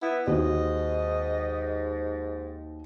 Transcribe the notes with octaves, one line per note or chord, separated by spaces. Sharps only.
B3 E4
D#2 G#2 F#4 D#5